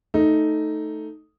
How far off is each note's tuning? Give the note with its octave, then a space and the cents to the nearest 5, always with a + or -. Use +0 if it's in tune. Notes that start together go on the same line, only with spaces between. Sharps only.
A3 +0 D#4 +0